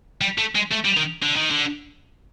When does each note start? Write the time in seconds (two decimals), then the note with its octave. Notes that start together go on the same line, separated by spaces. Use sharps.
0.21 G3
0.38 A3
0.55 G#3
0.72 A3
0.85 G3
0.97 D#3
1.23 D3
1.36 D#3
1.51 D3